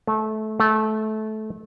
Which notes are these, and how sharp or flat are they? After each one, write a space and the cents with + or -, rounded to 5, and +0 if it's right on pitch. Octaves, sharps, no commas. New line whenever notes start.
A3 -20
A3 -20